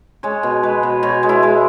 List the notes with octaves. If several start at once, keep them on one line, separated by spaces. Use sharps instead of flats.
G#3 C#5
B2
G#3 B4
B2
B2 C#5
G#3
E4
G#3